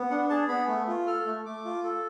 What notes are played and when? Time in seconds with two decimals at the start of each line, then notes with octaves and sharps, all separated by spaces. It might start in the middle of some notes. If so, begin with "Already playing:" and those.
Already playing: B3
0.10 D4 F#5
0.30 G#4 A5
0.48 B3 B5
0.68 A3
0.87 F4
1.06 A4 F6
1.25 A3
1.46 A3 D6
1.65 F4
1.84 A4